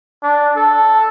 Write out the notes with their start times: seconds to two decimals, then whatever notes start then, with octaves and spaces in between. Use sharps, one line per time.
0.23 D4
0.56 A4